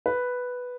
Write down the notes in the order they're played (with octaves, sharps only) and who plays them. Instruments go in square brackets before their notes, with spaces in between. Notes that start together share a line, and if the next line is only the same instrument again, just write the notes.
[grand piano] B4